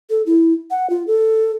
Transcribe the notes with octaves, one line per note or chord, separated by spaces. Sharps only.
A4
E4
F#5
F4
A4